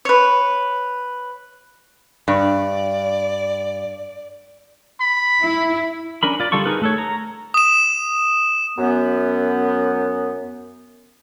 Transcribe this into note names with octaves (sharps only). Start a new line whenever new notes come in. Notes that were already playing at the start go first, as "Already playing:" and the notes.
B4 C#5
G2 D5
B5
E4
C#4 D4 A#4 B5
F4 D5
D3 G3 F4 A4 C#6
D#4 G#4 A#4 B4
A3 A4 C#5
A#5
D#6 E7
F#2 B3